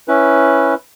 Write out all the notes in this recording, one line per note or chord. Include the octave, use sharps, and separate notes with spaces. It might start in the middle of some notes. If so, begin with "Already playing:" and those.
C#4 E4 B4